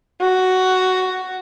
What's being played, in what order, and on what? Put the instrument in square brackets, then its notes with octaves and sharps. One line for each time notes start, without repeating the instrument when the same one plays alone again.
[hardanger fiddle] F#4